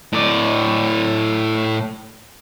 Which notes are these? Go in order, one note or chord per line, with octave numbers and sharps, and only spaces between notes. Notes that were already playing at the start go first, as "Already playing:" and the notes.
A2 D5